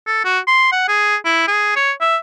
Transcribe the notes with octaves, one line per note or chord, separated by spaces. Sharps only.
A4
F#4
C6
F#5
G#4
E4
G#4
C#5
E5